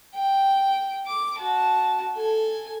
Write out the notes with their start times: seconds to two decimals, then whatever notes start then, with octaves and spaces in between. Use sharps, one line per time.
0.15 G5
1.06 D6
1.38 F#4 A5
2.15 A4 G#5